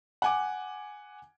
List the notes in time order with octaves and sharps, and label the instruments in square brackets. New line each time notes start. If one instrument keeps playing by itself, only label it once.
[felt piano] F#5 G#5 D6